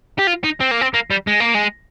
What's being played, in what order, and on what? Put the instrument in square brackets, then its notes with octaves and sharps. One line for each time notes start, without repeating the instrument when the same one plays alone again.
[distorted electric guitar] G4
F4
D#4
C4
A#3
C4
A#3
G3
G#3
A#3
G#3